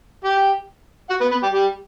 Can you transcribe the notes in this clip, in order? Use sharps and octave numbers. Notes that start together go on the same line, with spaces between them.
G4 G5
F#4 F#5
B3 B4
B3 B4
G3 G4
G3 G4